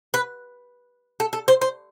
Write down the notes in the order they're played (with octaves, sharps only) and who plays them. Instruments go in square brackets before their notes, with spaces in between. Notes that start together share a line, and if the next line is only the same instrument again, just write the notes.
[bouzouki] B4
A4
A4
C5
C5